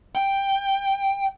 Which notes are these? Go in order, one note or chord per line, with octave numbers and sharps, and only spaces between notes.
G5